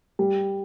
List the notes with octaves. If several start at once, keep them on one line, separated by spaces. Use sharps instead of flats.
G3